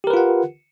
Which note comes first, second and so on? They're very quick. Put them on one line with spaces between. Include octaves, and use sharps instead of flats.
G4 A#4 B4 F4 F#5